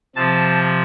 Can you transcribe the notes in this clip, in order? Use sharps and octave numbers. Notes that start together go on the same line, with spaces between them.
C3 F3 A5